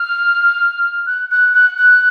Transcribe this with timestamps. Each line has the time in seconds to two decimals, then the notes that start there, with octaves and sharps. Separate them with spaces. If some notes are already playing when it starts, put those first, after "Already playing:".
Already playing: F6
1.07 F#6
1.31 F#6
1.54 F#6
1.78 F#6